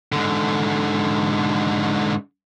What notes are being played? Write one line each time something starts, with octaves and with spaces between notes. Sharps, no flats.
G#2 D3